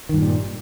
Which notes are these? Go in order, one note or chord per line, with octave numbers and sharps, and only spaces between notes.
G2 A#2 D#3 G3